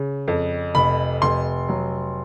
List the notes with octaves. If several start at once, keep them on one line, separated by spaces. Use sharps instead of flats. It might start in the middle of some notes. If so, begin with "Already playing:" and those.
Already playing: C#3
F2
F1 B5
F1 C6
F#3